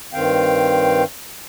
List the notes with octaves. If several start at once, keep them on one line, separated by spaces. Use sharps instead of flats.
G2 D#3 C4 F5 G5